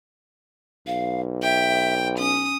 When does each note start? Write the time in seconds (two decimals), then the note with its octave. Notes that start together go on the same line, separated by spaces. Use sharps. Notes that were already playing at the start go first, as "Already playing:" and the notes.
0.87 B1 F5
1.43 E5 G5
2.18 C#4 D#6